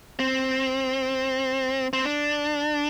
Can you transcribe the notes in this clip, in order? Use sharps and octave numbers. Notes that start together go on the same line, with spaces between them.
C4
C4
D4